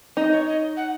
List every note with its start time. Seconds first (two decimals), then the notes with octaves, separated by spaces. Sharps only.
0.16 D#4 D#5
0.32 C#5
0.46 D#5
0.77 F#5